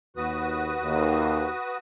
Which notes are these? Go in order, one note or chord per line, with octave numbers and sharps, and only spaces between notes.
D#2 F#4 B4 D#6
D#2